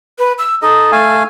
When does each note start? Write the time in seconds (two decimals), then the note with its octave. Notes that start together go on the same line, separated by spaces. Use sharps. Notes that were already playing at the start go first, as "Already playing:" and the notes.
0.19 B4
0.39 E6
0.62 D#4 A4 D#5
0.92 A3 F5 G#5